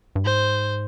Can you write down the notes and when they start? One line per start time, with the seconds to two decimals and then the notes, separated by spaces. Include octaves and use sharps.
0.15 G2
0.25 G#2 C5